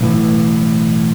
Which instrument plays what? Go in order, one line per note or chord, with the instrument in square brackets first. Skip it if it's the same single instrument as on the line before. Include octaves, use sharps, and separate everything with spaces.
[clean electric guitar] B1 A2 E3